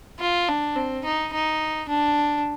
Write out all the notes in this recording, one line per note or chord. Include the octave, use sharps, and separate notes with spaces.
F4
D4
C4
D#4
D#4
D4